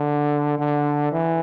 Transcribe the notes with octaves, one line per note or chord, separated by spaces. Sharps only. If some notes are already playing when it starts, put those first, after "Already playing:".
Already playing: D3
D3
E3